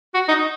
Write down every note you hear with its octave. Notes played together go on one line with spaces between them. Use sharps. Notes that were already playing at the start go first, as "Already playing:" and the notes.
F#4
D#4